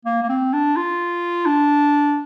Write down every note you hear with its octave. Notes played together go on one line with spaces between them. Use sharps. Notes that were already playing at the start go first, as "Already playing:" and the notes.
A#3
A#3
C4
D4
F4
D4